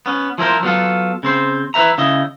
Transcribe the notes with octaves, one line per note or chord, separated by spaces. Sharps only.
B3 C#4
F3 E4 G#4 A#4 C5
F#3 B3 F4 A4
C#3 C4 C5
E4 B4 C5 E5 A#5
C#3 E4 D#5